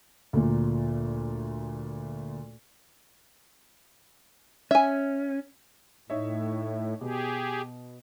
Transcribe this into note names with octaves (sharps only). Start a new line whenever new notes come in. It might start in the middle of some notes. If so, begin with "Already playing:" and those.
D2 A#2
C#4 E5 G#5
A2 D#4 C#5 E5
B2 G4 G#4